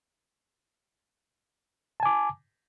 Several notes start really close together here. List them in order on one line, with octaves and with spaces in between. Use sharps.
A5 G#5 D6